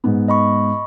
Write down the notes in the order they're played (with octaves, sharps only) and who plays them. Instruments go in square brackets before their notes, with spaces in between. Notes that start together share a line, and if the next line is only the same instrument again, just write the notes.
[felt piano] G#2 B3
[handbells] D#5 B5 C#6